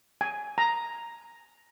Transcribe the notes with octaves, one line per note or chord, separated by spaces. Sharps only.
G#5
A#5